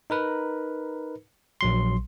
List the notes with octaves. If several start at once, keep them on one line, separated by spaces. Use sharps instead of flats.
D#4 A#4 B4
A#1 F#3 C6